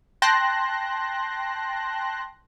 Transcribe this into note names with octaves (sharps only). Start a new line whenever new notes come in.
G5 A5 C6 F#6 A#6